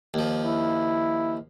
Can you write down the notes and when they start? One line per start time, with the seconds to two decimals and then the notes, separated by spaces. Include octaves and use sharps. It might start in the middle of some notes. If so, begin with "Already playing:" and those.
0.14 D#2 F3
0.45 E4